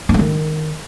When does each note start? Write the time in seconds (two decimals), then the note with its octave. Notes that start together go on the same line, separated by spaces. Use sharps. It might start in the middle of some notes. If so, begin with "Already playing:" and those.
0.09 B3
0.14 A3
0.19 D#3